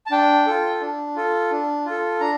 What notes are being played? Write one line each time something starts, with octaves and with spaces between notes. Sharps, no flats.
A5
D4 G5
F4 A4
D4
F4 A4
D4
F4 A4
D4 A#5